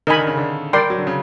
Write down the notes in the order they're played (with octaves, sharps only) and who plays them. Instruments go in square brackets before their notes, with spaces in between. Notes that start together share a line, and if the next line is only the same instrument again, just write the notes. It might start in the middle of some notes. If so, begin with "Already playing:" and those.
[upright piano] D#3 [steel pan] A#4 D#5 G#5 B5
[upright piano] D3
C#3
D3
[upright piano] G3 [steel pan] A#4 D5 G5 C6
[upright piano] F#3
D3
C#3